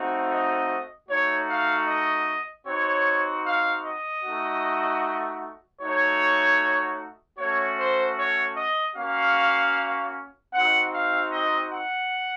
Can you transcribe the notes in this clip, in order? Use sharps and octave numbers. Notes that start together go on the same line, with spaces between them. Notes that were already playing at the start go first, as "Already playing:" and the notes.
Already playing: A3 C4 D#4 F#4
D#5
A3 D#4 F#4 C#5
F5
D#5
C4 D#4 F#4 C#5
F5
D#5
A3 D#4 F#4
A3 D#4 F#4 C#5
A3 C#4 F#4 C#5
C5
C#5
D#5
A#3 C#4 F#4 F5
C4 D#4 F#4 F#5
F5
D#5
F#5